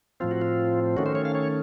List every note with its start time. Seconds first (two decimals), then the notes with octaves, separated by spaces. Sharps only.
0.20 A2 F3 C4 F4
0.31 F#4
0.41 F4
0.97 D#3 A3 C#4 F#4
1.06 C5
1.15 C#5
1.25 F5
1.35 C#5